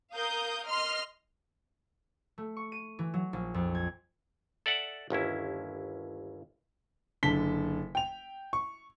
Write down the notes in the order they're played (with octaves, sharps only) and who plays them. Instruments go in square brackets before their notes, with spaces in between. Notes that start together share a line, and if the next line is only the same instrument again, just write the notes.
[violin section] A#4 F5 D#6 G6
D#5 C6 F6
[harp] A3
C#6
D#7
E3
F#3
A#1
F2
G#6
[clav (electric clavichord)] A4 D5 E5 F#5
G1 D#2 C#4 E4
[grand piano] F#1 D3 A5 B6 G7
G5 F7
C#6